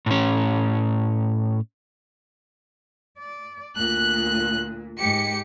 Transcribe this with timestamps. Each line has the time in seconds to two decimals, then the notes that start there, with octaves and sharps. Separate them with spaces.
0.06 A2 C#4
3.19 D5
3.76 D2 A#2 F#6
4.98 G#2 G4 C#7